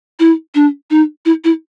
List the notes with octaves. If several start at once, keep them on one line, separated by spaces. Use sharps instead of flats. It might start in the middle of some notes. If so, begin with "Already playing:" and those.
E4
D4
D#4
E4
E4